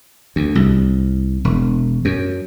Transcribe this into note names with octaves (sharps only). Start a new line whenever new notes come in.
D2
C2
E1
F#2